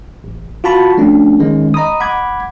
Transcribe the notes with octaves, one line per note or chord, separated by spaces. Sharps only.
A1
F4 F#4 A5 B5 C#6
F3 A3 C#4 D4
D#3 G#3 C#4
D#5 A#5 B5 D#6
F#5 B5 D6 G#6